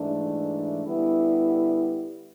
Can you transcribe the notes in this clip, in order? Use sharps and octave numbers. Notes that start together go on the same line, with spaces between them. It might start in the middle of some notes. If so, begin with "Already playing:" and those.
Already playing: G#2 E3 A3 D4
D3 G3 B3 E4